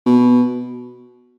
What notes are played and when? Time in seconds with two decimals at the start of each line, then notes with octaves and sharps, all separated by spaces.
0.06 B2